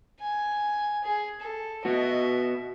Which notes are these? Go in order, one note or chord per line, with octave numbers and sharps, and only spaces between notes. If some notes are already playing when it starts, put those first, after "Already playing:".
G#5
G#4
A4
B3 F#4 D#5 E5